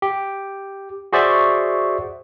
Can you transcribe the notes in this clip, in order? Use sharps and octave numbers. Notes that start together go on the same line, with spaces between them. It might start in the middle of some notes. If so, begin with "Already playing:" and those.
G4
F#4 G#4 C5 D5 E5 C#6